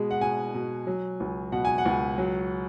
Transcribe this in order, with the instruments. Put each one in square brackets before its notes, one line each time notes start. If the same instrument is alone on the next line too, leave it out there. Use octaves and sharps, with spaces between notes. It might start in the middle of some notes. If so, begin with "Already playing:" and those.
Already playing: [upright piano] B2 G#3
F#5
B2 G#5
B2
F#3
C#2
B2 F#5
G#5
F#5
C#2
F#3